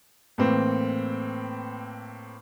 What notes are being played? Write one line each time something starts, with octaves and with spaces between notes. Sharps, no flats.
A2 E3 A#3 C4